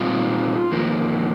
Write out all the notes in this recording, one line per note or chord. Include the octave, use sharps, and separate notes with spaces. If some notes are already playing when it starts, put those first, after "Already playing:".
Already playing: A#2 G3 C4 D#4 F4
F2 D#3 A#3